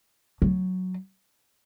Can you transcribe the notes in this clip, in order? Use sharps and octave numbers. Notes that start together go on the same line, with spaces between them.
F#3